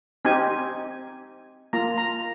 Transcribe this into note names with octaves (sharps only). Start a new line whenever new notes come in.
C4 D#4 G4 G#5
A#3 F4 A#5
A#5